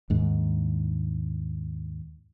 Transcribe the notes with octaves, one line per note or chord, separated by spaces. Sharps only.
D#2 G#2 D4